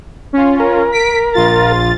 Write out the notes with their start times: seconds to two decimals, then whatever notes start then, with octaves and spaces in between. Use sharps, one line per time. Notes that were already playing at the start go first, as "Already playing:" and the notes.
0.33 C#4 F4
0.60 A#4
0.92 B6 D7
1.34 A#1 F4 A6